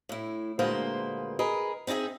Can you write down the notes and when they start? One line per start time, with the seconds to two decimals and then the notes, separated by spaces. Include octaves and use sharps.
0.09 A2 E4
0.59 D2 A#2 G#3 A#3 B4 C5
1.39 G#4 A#4 B4 D#5
1.87 C4 D#4 E4 G#4 E5